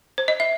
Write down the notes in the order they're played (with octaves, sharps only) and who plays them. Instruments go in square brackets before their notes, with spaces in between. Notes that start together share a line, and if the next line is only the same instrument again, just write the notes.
[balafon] C5
D#5
E5